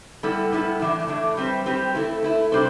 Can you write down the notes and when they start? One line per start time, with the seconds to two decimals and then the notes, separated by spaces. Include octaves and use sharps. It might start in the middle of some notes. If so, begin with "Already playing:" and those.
0.23 A2 G3 B3 E4 A4
0.52 A2 G3 B3 E4 A4
0.80 A2 E3 A3 D4
1.08 A2 E3 A3 D4
1.37 G3 C4 G4 B4
1.66 G3 C4 G4 B4
1.95 A3 E4 B4
2.23 A3 E4 B4
2.52 C3 G3 D4 A4 C5